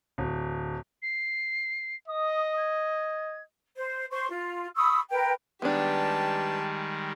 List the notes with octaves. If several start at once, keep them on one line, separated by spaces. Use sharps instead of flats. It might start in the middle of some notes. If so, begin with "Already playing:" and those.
D1
C7
D#5 D#6
G#6
C5
C5 C6 C#6
F4
B5 C#6 D#6 E6
A#4 B4 G5
D#3 G3 G#3 B3 D4 G4 A5